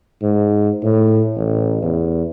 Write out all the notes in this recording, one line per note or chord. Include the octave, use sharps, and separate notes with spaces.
G#2
A2
A1
E2